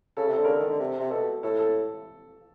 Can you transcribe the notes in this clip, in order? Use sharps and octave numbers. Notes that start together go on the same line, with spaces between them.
C#3 A4
C3
A4
D3
C#3 D3 A#4
D#3 A4
D3
C3
C3
B2 A4
A2 A4
A4